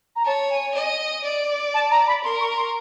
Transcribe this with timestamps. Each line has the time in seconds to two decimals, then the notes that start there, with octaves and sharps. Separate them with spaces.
0.16 A#5
0.25 C#5 A5
0.50 G#5
0.75 D#5
1.24 D5
1.74 A5
1.91 A#5
2.07 B5
2.24 A#4 C6
2.41 C#6
2.57 C6